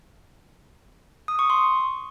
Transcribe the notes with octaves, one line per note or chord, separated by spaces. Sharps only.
D#6
C#6
C6